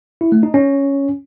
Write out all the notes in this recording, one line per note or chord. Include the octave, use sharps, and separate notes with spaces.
E4
A3
D#4
C#4